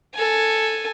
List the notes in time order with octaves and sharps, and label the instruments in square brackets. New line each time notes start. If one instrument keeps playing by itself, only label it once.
[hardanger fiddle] A4 G#5